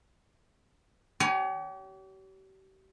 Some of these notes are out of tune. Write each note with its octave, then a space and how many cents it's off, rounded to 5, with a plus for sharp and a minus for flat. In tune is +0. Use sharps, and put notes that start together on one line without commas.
G4 -40 C#5 +30 G#5 +0